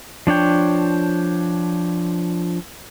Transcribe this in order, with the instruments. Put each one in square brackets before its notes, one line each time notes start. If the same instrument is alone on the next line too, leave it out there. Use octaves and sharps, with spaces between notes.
[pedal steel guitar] F3 D4 C#5 G5